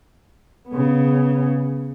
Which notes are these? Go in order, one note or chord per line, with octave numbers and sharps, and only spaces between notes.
C#3 B3